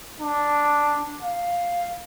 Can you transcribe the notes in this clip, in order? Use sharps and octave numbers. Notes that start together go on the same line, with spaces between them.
D4
F5